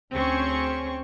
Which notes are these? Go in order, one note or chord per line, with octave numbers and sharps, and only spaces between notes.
D2 C4 C#4 G#4 C#6